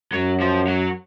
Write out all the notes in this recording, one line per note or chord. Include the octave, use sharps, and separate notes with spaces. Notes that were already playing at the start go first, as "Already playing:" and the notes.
F#2 F#3
F3
F#3